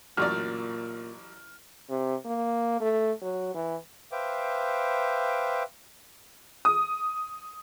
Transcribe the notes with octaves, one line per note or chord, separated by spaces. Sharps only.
A1 F#2 A#2 D5 F6
C3
A#3
A3
F#3
E3
B4 C5 E5 F5 G5 D6
D#6